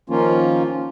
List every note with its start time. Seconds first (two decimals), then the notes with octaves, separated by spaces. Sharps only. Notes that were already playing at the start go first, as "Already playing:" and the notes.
0.10 D#3 F3 A#3 C#4 F4